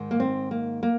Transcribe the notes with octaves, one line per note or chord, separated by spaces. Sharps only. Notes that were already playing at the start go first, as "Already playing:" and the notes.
Already playing: G#2 D#3
A#3
C4
A#3
A#3